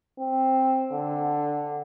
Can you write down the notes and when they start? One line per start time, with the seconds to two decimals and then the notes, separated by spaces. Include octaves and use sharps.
0.19 C4
0.92 D3